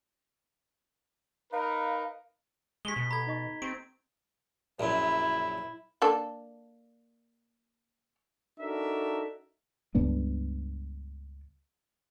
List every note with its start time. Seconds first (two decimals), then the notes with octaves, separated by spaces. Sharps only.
1.53 D#4 A#4 B4 F5
2.85 G#3 G4 G#5 D#6 B6 G7
2.96 B2
3.11 A4 A#5 B5 G#6
3.27 D#4 D#5 C#6
3.62 C4 G4 D7
4.80 A#1 F#2 E4
6.02 A#3 D4 A4
8.59 D4 D#4 F#4 A4 A#4 E5
9.95 C#2 G2 B3 D4